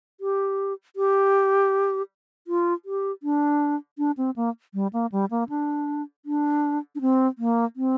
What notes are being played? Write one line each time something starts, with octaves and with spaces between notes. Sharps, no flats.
G4
G4
F4
G4
D4
D4
C4
A#3
G3
A#3
G3
A#3
D4
D4
D4
C4
A#3
C4